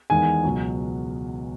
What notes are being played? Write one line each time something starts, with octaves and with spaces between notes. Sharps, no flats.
E2 D#3 G#3 G#5
C#2 B2 F#3